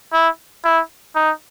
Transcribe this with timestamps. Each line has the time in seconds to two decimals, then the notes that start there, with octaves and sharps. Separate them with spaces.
0.13 E4
0.65 E4
1.15 D#4